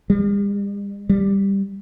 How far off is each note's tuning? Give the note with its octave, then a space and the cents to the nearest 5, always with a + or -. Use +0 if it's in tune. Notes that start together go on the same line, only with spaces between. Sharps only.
G3 +45
G3 +5